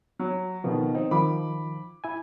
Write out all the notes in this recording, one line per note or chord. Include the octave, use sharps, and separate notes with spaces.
F#3
B2 D3 D#3 F3
C4 D#4
D#3 F3 B5 D6
E4 G#5